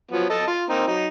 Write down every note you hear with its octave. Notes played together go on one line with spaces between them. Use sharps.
F3 F#3 B3
A4 D#5 A5
F4
A#3 C4 D#4
F#3 D#4